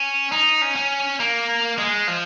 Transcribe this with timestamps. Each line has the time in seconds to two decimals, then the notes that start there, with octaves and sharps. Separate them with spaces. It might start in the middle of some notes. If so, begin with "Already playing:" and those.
Already playing: C#4
0.32 D#4
0.62 C#4
0.76 C#4
1.20 A#3
1.78 G#3
2.08 F3